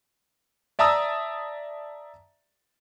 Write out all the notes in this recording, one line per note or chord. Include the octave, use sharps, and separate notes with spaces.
D5 E5 A5 A#5 D#6 E6